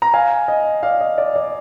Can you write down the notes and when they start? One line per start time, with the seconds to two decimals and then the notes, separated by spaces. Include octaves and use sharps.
0.02 A#5
0.14 F5 G#5
0.48 D#5
0.83 D5 F5
1.01 D#5
1.18 D5
1.36 D5